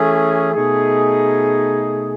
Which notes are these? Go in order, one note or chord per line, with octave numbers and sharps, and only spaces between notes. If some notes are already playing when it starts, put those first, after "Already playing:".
Already playing: E3 A3 C#4 G#4
B2 A3 D#4 G#4